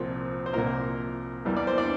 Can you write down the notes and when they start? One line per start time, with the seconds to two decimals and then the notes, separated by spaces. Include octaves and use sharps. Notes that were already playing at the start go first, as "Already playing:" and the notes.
Already playing: C2 A#2 F3 A#3 C4
0.46 C5
0.53 C2 A#2 F3 A#3 A#4
1.45 E2 E3 G3 A#3
1.57 D5
1.67 C5
1.78 D4 D5